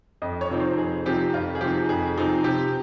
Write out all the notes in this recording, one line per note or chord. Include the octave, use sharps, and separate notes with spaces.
F2 D#5
C#5
C3 F3 C4 D#4
C5
F2 G#4
C3 F3 C4 D#4 G4
F2 F4
G#4
C3 F3 C4 D#4 G4
F2 G#4
C3 F3 C4 D#4
C3 G4